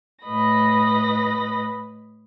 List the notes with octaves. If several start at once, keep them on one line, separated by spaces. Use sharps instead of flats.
A2 B4 D#5 B5 A#6